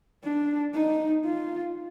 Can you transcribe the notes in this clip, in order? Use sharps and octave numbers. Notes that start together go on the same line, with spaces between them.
D4
D#4
F4